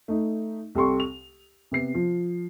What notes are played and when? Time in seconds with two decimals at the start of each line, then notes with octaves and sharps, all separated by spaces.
0.08 A3 D#4
0.75 C2 G4 A4 C6 C#6
1.00 F7
1.71 C3 B3 C7
1.95 F3